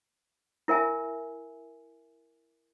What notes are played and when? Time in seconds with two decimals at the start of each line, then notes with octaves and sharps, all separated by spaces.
0.68 E4 A#4 E5 G#5